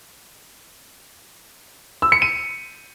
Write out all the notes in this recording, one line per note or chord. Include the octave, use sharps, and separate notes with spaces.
E6
C#7
D#7